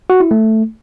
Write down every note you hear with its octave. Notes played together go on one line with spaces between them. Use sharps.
F#4
E4
A3